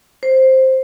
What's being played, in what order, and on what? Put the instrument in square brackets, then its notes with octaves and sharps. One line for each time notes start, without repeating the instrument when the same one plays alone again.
[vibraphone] C5